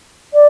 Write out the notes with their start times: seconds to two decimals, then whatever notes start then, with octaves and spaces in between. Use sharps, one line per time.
0.34 D5